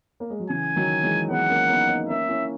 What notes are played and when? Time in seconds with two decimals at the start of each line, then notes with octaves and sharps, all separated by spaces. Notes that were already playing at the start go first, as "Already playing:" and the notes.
0.20 A#3
0.30 G#3
0.40 F#3
0.49 C#3 E3 G#5
0.76 D#3 F#3
1.03 E3 G#3
1.29 G#3 B3 F#5
1.50 A#3 C#4
1.69 B3 D#4
1.89 B3 D#4
2.09 A#3 C#4 E5
2.28 C#4 E4